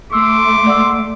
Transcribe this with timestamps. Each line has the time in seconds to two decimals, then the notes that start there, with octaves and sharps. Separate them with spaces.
0.13 A3 C6 D6 E6
0.66 D5 F#5 E6